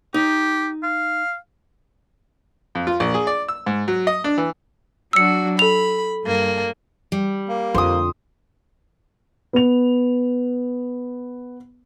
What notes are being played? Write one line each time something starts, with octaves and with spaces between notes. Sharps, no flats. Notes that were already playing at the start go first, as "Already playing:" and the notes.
D#4 G4
F5
F2
F4
A#1
G#4
D5
E6
G#2
F#3
D#5
D4
E3
F#3 D4 F#4 E6 C#7
A4 B5 F7
G2 A#3
G3
A#3
F2 D3 C5 D#6
B3 F7